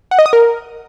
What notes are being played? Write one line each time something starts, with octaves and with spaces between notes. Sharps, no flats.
F#5
D#5
D#6
A#4